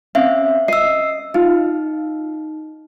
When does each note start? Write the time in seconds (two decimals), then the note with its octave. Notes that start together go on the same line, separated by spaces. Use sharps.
0.15 C4 C#4 E5 F5
0.68 D#5 E6 C7
1.34 D#4 F4